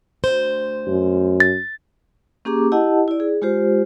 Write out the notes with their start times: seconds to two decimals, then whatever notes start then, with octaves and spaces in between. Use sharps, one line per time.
0.24 D2 C5
0.87 F#2
1.40 A6
2.45 A#3 C#4 G4 G#4 A#5 D6
2.72 E4 G4 D#5 F#5 A5
3.08 E4 D5
3.20 G#4
3.42 G#3 F4 G4 C5